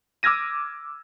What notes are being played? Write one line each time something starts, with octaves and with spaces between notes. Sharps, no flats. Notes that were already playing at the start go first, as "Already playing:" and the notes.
D6 E6 F6 G#6 A#6 D#7